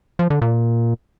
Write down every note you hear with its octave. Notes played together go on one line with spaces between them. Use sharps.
F3
D3
A#2